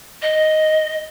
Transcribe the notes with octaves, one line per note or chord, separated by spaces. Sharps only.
D#5